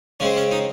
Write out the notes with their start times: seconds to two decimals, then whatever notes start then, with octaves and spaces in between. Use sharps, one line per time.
0.20 C#3 G#3 C4 C#4
0.36 C#4
0.51 D#4